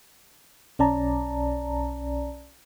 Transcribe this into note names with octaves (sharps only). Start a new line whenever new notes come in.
B1 C#4 D5 A5 A#5